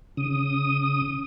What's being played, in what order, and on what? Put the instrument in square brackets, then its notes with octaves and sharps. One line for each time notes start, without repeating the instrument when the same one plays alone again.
[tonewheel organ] C#3 D#6